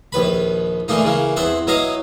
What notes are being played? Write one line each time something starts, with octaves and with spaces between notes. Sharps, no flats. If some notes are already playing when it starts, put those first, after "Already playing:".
A#1 D#2 B4 B5
D3 E3 A3 A#3 D#4
C#3 E3 A#3
E2 C4 E4 F#5 C6
F#3 B3 E4 D#5 F5